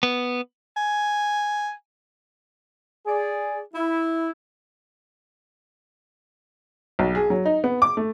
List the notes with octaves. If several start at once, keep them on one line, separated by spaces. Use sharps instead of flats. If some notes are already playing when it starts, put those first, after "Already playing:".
B3
G#5
G#4 D5
E4
B1
G#4
F#3
D#4
B3
D6
A3